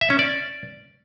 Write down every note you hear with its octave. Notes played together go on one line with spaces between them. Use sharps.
E5
C#4
D5